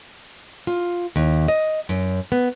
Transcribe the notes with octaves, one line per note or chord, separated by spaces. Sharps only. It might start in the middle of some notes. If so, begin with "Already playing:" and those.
F4
D#2
D#5
F#2
B3